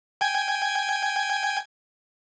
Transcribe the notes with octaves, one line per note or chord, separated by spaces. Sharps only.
G5 G#5 G#6